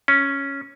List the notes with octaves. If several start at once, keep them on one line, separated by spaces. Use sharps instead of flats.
C#4